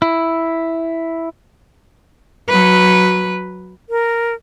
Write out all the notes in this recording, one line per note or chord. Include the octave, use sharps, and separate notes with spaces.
E4
F#3 B4
A#4